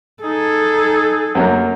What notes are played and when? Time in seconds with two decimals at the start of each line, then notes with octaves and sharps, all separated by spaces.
0.23 D#4 G#4 A4
1.35 F#2 F#3 A#3